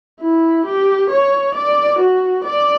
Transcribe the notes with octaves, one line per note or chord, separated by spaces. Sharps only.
E4
G4
C#5
D5
F#4
D5